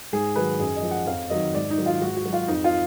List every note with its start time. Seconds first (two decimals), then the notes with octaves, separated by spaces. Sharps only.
0.13 G#2 G#4
0.36 D#3 F#3 B4
0.59 F#2 G#4
0.76 D#5
0.83 F3
0.91 F#5
1.07 F2 F5
1.30 D#3 F#3 D#5
1.54 G#2 D5
1.70 D#4
1.78 D#3 F#3
1.86 F4
2.01 G#2 F#4
2.17 F#4
2.25 F#3
2.33 F4
2.48 F2 D#4
2.64 F4